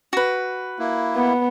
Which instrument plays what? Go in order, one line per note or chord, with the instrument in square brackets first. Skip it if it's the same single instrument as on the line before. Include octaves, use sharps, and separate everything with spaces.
[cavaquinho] F#4 B4
[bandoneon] A#3 E4
[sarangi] B3